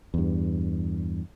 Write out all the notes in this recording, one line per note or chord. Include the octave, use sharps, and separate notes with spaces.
E2 G2